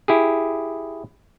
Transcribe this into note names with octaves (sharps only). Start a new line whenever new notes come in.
E4 G4 G#4